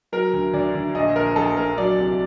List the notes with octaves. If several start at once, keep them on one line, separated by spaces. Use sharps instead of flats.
F#3 A#4
D2
D2 D5
D2
A#1 D#5
A#1 A#4
A#1 A4
A#1 A#4
F#3 D5
C2